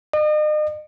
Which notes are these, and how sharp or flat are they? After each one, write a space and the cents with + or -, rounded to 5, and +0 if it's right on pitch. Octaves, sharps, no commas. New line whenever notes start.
D#5 -40